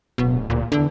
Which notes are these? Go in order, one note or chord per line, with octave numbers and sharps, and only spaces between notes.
D1 B2
D1 A#2
E2 D3